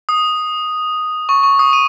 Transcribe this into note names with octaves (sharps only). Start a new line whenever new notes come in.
D#6
C#6
C#6
D#6
D#7